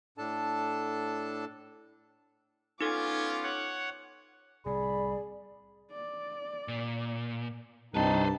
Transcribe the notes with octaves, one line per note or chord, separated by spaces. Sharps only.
A2 D4 A4 A5
B3 C#4 D#4 F4 A4 D6 G#6
C#5 F#5
C2 A2 C3 G#4 D5 B5
D5
A#2
C2 G2 C4 D#4 B4 C5 A5